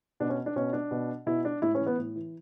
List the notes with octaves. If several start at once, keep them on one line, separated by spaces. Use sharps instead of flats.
B2 D4
C#4
D4
B2 C#4
D4
B2
B2 E4
D4
A2 E4
C#4
E3
B3
A2
E3